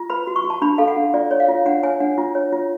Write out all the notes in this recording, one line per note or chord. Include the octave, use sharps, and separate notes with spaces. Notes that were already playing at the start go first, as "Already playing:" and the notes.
Already playing: F4
B4 B5
F#4
C#6
F#4
A5
D4 B5
A4 F5
F#5
D4
F4 D5
C#5
F5
F4
D4 F#5
C#5 G#5
D4 F#5
F4
C#5
F4